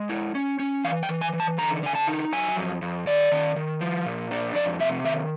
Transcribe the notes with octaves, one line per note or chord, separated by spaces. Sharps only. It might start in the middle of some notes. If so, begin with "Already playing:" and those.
Already playing: G#3
E4
C#4
C#4
E3 F5
G5
E3
G#5
E3
A5
D3 A#5
D3 G#5
A5
D#4
F#3 G#5
F2
F2
D#3 D5
D#3
D#3
F3
A#2
D4
F2 D5
C3 E5
D#3 E5